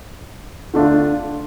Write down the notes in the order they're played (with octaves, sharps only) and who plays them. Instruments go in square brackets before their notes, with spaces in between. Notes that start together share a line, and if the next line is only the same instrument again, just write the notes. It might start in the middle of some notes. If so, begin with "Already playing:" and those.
[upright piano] D3 A3 D4 F4